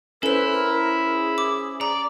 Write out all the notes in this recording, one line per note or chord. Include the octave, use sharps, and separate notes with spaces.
C#4 E4 A4 B4 C5 E7
A#4
G#4
D6
D5 A#5